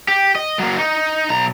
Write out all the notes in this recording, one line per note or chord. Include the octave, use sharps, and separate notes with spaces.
G4
D#5
F#3 A#3
D#4
B1 A#5